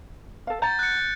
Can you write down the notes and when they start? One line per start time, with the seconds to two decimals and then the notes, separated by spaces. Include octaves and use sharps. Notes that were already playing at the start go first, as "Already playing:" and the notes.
0.47 A4 F5
0.62 F#5 A#5 G6 A6
0.79 F#6 C#7